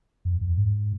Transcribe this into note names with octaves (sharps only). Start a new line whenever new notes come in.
F2
F2
G#2